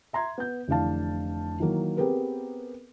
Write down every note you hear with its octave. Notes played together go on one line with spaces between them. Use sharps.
E5 A#5 C6 G#6
B3 G6
F1 D3 E3 D4 F5 A5
D#3 E3 F#3 A#3
B3 C4 G4 G#4 A#4 B4